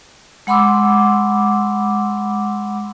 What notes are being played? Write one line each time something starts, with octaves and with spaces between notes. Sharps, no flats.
G#3 F#5 B5 C6 D6 E6